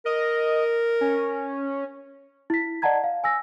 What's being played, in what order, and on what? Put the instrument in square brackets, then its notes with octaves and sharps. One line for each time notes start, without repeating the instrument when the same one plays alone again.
[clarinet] A#4 [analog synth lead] D#5
[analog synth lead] C#4
[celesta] E4 B6
D5 D#5 F#5 A5 A#5 G#6
F5
G#5 E6 A#6